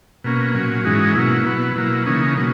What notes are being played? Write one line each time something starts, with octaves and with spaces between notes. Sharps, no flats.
B2 A#3 C#4
A#2 F#3 C#4
G#2 E3 G#3 C#4 D#4 F#4
B2 F#3 A#3 C#4 E4
B2 F#3 B3
B2 F#3 A#3 E4
C#3 E3 A#3 C#4 D#4
B2 F#3 A#3 C#4